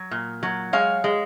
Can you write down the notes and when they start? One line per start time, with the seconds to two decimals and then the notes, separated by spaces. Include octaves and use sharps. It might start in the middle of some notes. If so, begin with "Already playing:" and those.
Already playing: F#3
0.11 A#2
0.43 F#3
0.73 G#3 C#5 F5
1.04 G#3